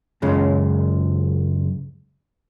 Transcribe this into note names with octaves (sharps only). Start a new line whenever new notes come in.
C#2 F#2 C#3 G#3